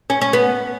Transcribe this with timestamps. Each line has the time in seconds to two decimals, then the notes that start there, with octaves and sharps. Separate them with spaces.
0.10 C#4
0.21 C#4
0.33 B3